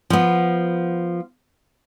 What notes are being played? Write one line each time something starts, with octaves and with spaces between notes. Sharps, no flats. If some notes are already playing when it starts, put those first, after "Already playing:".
F3 B3